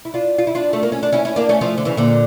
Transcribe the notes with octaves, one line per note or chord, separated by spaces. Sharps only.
E4
D4 F4
F4
E4
D4 F4
A3
A#3
C#4
D4
C#4 E4
C#4 E4
A#3 D4
A3 C#4
F3 A3
D3
C#3 E3
A#2 D3